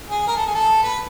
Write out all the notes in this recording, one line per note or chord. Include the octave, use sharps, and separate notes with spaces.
G#4
A#4
A4
G#4
A4
B4